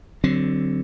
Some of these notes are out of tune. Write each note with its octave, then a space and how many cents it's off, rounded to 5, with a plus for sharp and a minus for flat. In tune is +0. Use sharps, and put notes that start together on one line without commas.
D3 +5 F#3 +25 C4 +0